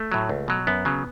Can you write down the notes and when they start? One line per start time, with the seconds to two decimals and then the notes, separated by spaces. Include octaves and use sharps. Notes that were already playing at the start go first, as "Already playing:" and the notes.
Already playing: A3
0.12 A2 F#3
0.29 C#2
0.48 B2 F#3
0.67 F#2 B3
0.85 C#3 F#3